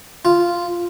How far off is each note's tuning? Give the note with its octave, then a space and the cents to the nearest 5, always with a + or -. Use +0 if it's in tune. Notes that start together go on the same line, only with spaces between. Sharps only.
F4 -5